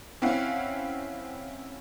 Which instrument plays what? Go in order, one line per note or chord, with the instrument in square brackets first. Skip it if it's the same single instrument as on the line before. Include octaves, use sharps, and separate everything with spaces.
[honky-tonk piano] C4 C#4 E4 F5 F#5